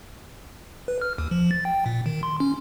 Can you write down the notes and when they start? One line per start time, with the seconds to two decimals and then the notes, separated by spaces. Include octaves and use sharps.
0.88 B4
1.01 F6
1.18 D#2
1.31 F3
1.51 A6
1.65 G5
1.86 A#2
2.06 D#3
2.23 C6
2.40 C#4